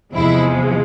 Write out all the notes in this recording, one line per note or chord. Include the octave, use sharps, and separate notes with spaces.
E2 C3 F3 G#3 E4